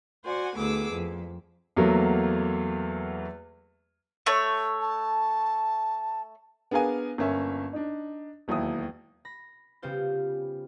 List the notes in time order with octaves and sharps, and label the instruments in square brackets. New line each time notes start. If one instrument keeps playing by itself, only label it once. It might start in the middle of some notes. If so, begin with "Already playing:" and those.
[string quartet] F#4 C5 D5 F#5 G#5
D2 A2 B3 G#4 D6 E6
F2
[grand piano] E2 F#3 A3 A#3
[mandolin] A3 C#5
[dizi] A5
[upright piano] B3 D4 G#4 A#4 F5 G#5
G1 A#3 C#4 E5
D4 D#4
E1 D#2 F#3 E4 D#6
[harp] B5 A#6
C#3 G3 B3 F4 C5 G6